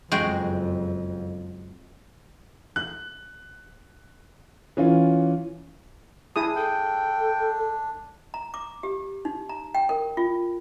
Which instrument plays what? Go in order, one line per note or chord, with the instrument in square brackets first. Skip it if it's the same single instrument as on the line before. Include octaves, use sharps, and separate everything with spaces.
[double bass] F#1 F2 [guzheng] G#3 F#4 G5
[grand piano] F#6
E3 C#4 F4
[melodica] D4 [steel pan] E4 G#4 D#6
[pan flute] A4 [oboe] G5
[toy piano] A#5
D6
G4
D#4
A#5
G5
A#4
F4